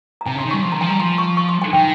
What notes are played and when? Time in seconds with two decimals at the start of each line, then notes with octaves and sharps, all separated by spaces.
0.21 A#5
0.26 C3 G#5
0.36 C#3
0.39 C6
0.45 D#3
0.51 G3 C#6
0.63 F3 C6
0.72 D#3 A#5
0.81 F3 G#5
0.90 G3 A#5
1.00 F3 C6
1.18 C#6
1.37 C#6
1.49 C6
1.62 G#5
1.73 D#3 G5